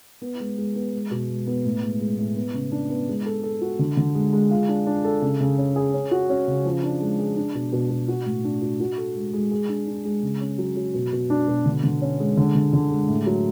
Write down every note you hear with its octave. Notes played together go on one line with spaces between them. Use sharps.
B3
G#3
G#3
B3
G#3
B2
G#3
B3
A2
G#3
G#3
A2
B3
C#3
D4
B3
G#3
A4
A4
F#4
D3
D3
G#3
G#3
F4
D4
D4
A4
C#3
C#3
C#4
G#4
C#4
F#4
C#4
C#3
F3
D4
G#3
G#4
D4
B2
B2
B2
F#4
A2
D4
F#4
F#4
A4
G#3
G#3
G#4
D4
D4
G#3
C#3
C#4
F#3
F#3
B2
B2
D4
B2
D3
D3
C#4
G#3
D3
D3
D3
G#3
A2
F#3